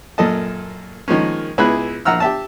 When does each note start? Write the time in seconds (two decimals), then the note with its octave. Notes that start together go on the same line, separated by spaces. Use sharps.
0.18 F#2 A#2 A4 D#5 A5
1.08 D#3 F3 G#3 A#3 C#4
1.58 C#2 B3 E4 G#4 B5 F#6
2.05 A#1 F#5 A#5 E6 F6
2.20 G4 E5 A5